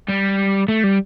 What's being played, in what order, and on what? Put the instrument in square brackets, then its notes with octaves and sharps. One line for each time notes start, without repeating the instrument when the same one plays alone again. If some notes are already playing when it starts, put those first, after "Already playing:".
[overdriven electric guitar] G3
A3
G3